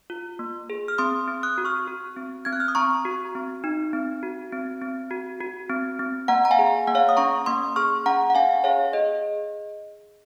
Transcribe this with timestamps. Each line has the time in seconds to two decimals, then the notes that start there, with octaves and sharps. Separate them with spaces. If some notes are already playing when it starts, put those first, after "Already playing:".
0.10 F4
0.39 A#3
0.70 G#4
0.88 F6
0.98 C4 C6 D#6
1.28 C4
1.43 D#6 F#6
1.58 F#4
1.65 C#6 F6
1.88 F#4
2.16 C4
2.45 C4 G#6
2.53 F#6
2.60 F6
2.68 D#6
2.75 C4 A#5 C#6
3.05 F#4
3.35 C4
3.64 D#4
3.93 C4
4.23 F#4
4.52 C4
4.82 C4
5.11 F#4
5.41 F#4
5.70 C4
5.99 C4
6.28 A#3 F#5 A#5
6.45 A#5
6.51 F5 G#5
6.59 G#4
6.87 A#3 F#5
6.95 C#5 F5
7.09 D#6
7.17 C#4 A#5 C#6
7.46 A#3 C6 D#6
7.76 G#4 C#6 F6
8.06 C#4 F#5 A#5
8.30 F#5
8.35 C#4 F5 G#5
8.64 G#4 C#5 F5
8.93 G#4 D#5